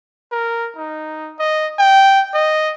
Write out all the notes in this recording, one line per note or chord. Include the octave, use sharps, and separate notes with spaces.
A#4
D#4
D#5
G5
D#5